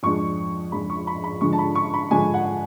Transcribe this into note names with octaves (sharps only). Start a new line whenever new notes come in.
F2 F3 G#3 D4 C#6
F2 F3 G#3 D4 B5
C#6
B5
B5
D3 F3 G#3 D4 C#6
A5
B5
C#6
B5
D3 F3 G#3 D4 G#5
F#5